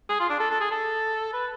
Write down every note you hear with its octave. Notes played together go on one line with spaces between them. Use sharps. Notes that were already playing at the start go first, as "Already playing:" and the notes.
G#4
F4
D4
A4
A4
G#4
A4
B4